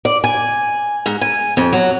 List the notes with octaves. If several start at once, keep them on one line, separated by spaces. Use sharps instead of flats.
D5
G#5
G#2
G#5
F2
F#3